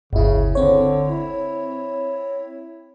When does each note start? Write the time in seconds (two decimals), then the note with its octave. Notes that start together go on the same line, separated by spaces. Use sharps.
0.13 G1 D2 C#3 E4
0.55 D3 C4 C#5
1.08 E4